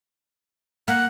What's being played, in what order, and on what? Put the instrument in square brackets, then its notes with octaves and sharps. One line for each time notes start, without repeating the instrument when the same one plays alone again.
[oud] A#3 [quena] F#5